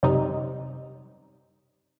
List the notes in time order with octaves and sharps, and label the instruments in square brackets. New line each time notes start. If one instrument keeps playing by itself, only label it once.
[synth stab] F#2 C3 G3 D#4